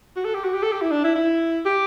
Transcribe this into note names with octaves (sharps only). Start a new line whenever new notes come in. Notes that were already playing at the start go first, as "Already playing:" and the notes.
F#4
A4
G4
F#4
G4
A4
G4
E4
D4
E4
E4
G4